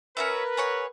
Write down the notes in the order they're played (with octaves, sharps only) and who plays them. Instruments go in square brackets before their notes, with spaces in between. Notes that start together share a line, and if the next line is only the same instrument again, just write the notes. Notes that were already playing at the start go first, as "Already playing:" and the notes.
[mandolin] C#4 F#4 E5 [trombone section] A#4 B4
[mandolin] G#4 C#5 F#5